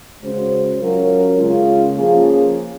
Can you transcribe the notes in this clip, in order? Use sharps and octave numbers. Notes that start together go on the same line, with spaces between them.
C#3 G#3 C#4 F#4 C5
F#3 C#4 F4 A#4
C#3 G#3 C#4 F4
F3 A#3 C#4 F4 G#4